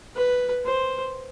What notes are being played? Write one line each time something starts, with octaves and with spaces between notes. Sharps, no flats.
B4
C5